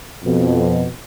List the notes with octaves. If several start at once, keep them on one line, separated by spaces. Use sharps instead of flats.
F2 B2